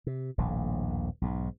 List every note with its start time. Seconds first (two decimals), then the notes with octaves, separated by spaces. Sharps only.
0.07 C3
0.38 D#1 A#1 A2
1.22 B1 G#2